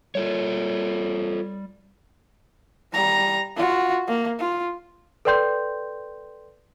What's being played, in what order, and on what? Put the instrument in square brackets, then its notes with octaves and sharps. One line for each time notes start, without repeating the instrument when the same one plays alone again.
[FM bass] G3 [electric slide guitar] F4 A4 C#5
[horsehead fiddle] G3 A#5
F4 F#4
A#3
F4
[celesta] A4 B4 D5 G5 C6 G6